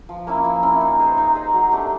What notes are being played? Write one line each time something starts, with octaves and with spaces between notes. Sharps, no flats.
F3
A#3 C#4 E4
F3
A#3 C#4 E4
D#4
G#4 C5 D#5
D#4
G#4 C5 D#5
F#3
A3 D4 G4